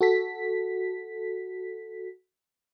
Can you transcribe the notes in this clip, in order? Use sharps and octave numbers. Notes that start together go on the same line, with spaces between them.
F#4 A4 B6